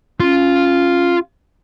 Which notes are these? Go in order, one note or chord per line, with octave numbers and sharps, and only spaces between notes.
C#4 F4